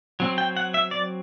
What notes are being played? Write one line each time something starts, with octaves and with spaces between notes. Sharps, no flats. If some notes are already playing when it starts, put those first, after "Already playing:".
F#3 C4
G5
F#5
E5
D5